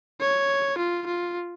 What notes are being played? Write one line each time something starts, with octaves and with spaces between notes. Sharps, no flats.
C#5
F4
F4